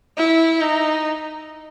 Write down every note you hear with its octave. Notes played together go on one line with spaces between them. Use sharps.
E4
D#4